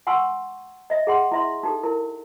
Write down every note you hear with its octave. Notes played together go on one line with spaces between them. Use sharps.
F#5 G#5 C6 C#6 E6
D#5 E5
G#4 F#5 C6
E4 E5 C6
D#4 G4 A4
E4 A#4